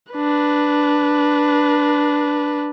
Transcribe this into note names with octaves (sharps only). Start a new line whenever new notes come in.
D4 B4